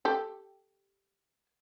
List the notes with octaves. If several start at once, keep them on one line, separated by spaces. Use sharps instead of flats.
G4 A4